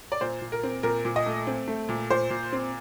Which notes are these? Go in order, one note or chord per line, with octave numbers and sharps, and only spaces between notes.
D5
A#2 C5
A#2
A#4
C4
A#2 A#4
A#2
D#5
A3
C4
A3
A#2
A#2 C5
A#2
C4